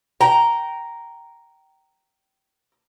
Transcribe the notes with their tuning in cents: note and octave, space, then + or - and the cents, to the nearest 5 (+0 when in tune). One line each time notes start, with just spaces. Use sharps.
G5 -20 A#5 +0